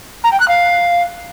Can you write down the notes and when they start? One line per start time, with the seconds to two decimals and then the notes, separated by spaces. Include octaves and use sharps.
0.24 A#5
0.32 G5
0.40 F#6
0.48 F5